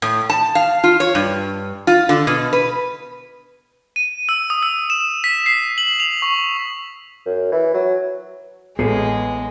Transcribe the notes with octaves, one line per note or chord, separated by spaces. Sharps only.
A2
A5
F5
F4
C#5
G2
F4
D3
B2
B4
D#7
E6
D#6
E6
E7
B6
C7
F#7
F7
C#6
F#2
E3
F#3
A1 G#3 B3 G#4 A4 B4